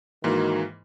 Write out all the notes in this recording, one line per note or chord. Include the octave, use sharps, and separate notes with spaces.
G#2 D#3 E3 A#3 F#4